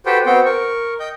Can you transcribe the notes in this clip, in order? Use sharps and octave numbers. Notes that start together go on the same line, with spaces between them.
F#4 G4 A4 B4 C5 G5
B3 C4 F#4 C5 G5
A#4 C#6
D#5 G5 G6